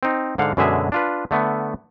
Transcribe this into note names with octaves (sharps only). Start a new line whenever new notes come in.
C4 D#4
G#2 D3 F5 F#5
F#2 B2 D3 G#3 G#4 E5
D4 F4 B4
D3 A3 B3